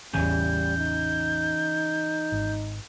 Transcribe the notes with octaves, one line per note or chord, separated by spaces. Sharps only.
A1 E2 C#3 E3 G3 G#5 G6
D#4
G#1